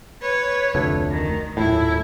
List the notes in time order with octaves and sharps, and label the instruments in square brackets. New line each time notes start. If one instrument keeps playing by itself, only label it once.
[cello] B4 C#5
[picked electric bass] F1 D2 A3
[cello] D#3
[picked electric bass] D#1 A2 [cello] F#2 E4